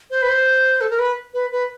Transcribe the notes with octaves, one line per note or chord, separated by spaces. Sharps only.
C5
B4
C5
A4
A#4
B4
B4
B4